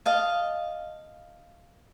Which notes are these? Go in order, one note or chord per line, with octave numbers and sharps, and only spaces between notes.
D#5 F5 A5